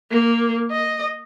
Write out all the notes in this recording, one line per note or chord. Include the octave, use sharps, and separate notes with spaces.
A#3
D#5